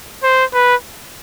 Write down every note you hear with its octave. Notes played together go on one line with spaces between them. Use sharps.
C5
B4